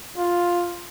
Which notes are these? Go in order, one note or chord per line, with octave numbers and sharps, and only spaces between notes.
F4